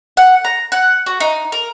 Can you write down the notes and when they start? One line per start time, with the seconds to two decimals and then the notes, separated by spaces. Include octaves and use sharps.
0.17 F#5
0.45 A#5
0.72 F#5
1.06 F#4
1.20 D#4
1.52 A#4